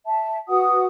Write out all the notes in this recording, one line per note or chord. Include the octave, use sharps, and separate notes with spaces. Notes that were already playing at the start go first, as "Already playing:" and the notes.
E5 A5
F#4 B4 F#5 D#6